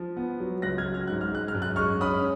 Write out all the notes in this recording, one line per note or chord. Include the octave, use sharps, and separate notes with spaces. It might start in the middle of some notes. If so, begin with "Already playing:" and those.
Already playing: F3
B3
F#3
C#2 F#6 A#6
F6 G#6
F#3
F6
G#2 F#6
F6
G#3 F#6
F6
F#2
F#6
G#3 C#6 F6
C#4 B5 D#6